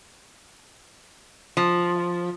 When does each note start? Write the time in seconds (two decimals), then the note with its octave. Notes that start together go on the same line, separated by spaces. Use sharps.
1.57 F3